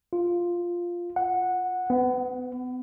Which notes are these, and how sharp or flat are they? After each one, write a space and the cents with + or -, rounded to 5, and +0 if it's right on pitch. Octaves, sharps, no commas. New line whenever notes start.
F4 +0
F#5 -10
B3 +30